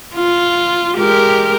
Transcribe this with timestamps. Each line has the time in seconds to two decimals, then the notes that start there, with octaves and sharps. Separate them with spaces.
0.15 F4
0.97 G#3 G4 A#4